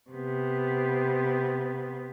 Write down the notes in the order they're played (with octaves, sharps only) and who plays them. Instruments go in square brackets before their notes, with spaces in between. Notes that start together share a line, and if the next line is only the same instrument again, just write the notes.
[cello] C3 B3